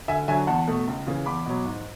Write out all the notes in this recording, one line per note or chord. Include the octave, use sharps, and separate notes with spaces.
D2 E5 G#5
D3 F#3 E5 G#5
E2 F#5 A5
B2 A3
C#2
C#3 E3
E2 B5 D6
B2 F#3
G#2